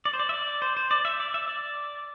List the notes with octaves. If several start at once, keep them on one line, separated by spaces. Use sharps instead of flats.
D5
C5
D5
E5
D5
C5
C5
D5
E5
D5
E5
D5